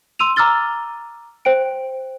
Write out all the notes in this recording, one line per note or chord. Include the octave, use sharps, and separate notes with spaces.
C6 E6 D#7 F7
A#5 D6 E6 F6 A6 G7
C5 G5 D7